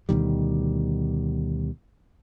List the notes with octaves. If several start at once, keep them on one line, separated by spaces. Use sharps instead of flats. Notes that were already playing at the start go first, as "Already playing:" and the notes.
D2 B2 D#3 G3